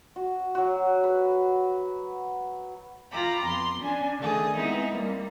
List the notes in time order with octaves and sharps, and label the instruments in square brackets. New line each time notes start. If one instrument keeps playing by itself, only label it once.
[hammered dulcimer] F#4
F#3 F#4
B4
[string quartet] F4 G5 A#5 B5 D6
F2 B3 C6
C#4 D4 G#5
D3 D#3 A3 G#4 D#6
G#3 B3 C4 D#4 E4
G3 A#3 C4